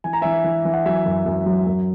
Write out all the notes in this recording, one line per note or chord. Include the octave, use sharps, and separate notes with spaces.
E3 G#5
A#5
E3 E5 G#5
E3
E3
F#5
F#3 E5 G#5
F#2
F#2
F#3
F#2